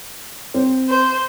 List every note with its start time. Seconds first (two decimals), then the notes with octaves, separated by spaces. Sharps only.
0.54 C4
0.89 C5